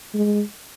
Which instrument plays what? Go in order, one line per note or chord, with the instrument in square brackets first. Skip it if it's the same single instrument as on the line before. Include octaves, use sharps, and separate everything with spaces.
[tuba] G#3